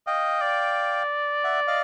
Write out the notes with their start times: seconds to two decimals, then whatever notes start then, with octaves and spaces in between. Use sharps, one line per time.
0.07 D#5 F5 G5
0.42 D5
1.44 E5 F#5
1.67 D#5 F5